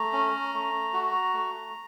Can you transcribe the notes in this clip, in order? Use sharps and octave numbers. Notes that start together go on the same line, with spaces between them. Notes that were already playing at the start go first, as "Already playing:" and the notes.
Already playing: A3 A#5
C#4
A3
F#4
A3